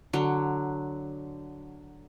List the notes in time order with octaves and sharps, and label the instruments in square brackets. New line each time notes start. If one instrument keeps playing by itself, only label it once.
[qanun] D3 F#3